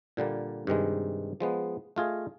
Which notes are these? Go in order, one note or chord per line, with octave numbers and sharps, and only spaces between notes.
A#2 D3 G3 A#3
G2 C3 D#3 G#3
F3 G#3 B3
A3 F4 G#4 D#5